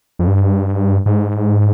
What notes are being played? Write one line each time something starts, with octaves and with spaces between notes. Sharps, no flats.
F2
G2
G#2